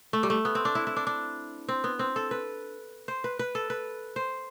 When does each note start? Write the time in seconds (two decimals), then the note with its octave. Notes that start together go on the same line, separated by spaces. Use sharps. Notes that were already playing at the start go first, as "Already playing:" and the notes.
0.13 A3
0.23 G3
0.30 A3
0.45 B3
0.55 C4
0.65 D4
0.75 E4
0.87 E4
0.96 D4
1.07 D4
1.68 C4
1.84 B3
1.99 C4
2.16 A4
2.31 B4
3.08 C5
3.24 B4
3.39 B4
3.55 A4
3.70 B4
4.16 C5